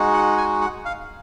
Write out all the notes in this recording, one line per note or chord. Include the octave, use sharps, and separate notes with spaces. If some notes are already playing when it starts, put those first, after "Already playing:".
Already playing: G#3 D#4 F#4
F#5
G#5
F#5
F5